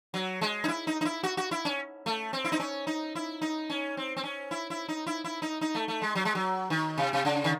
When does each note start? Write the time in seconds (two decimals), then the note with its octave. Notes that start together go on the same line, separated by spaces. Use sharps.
0.14 F#3
0.41 G#3
0.64 D#4
0.68 E4
0.87 D#4
1.01 D#4
1.05 E4
1.23 F#4
1.37 F#4
1.51 E4
1.65 C#4
2.06 A3
2.33 C4
2.44 E4
2.52 D#4
2.60 C#4
2.87 D#4
3.15 E4
3.41 D#4
3.70 C#4
3.97 C4
4.17 C4
4.23 C#4
4.51 E4
4.70 E4
4.88 D#4
5.07 E4
5.24 E4
5.42 D#4
5.61 D#4
5.75 A3
5.88 A3
6.02 G#3
6.15 F#3
6.25 G#3
6.35 F#3
6.70 D#3
6.98 C3
7.13 C3
7.25 C#3
7.44 D#3